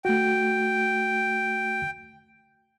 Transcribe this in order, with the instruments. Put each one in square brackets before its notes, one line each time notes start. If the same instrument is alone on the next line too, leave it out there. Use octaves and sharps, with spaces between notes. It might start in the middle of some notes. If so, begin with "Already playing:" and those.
[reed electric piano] A3 F#4 [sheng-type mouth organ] G5